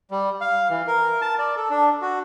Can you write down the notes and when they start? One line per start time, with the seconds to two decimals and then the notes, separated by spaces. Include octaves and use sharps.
0.11 G3
0.41 F5
0.70 E3
0.87 A#4
1.22 A5
1.39 D5
1.57 A4
1.70 D4
2.02 F#4